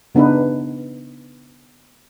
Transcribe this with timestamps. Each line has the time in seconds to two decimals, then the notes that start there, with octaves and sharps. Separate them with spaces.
0.15 C#3 B3 D4 D#4 B4